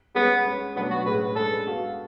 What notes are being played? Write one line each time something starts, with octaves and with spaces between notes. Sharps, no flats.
G#3 B3 C#4 G#4
G#3 C#4 G#4
B2 F#3 A3 B3 D4 F#4
F#4
A2 G#3 C#4 G#4 B4
G#3 D4 G#4 A4 B4
B3 F#4 A4 F5